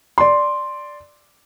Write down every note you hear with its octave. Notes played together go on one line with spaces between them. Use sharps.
D5 C6